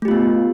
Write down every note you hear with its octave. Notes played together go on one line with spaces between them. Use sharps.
A3 B3 F4 G4